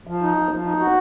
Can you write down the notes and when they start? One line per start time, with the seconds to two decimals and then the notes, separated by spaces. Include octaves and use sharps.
0.07 F3
0.22 D#4
0.37 F3
0.51 F3
0.65 D#4
0.79 F#4